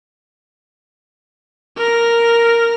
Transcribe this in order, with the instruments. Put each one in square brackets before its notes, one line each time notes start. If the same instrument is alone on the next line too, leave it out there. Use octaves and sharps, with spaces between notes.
[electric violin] A#4 A#6